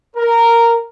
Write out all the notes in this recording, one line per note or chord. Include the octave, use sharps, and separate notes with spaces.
A#4